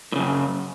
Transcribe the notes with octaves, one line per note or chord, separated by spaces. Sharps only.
F#2 A2 C#3